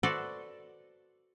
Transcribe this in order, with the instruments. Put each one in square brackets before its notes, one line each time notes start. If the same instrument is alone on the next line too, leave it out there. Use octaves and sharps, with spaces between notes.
[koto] F#4 A4 B4 C5 D5 E5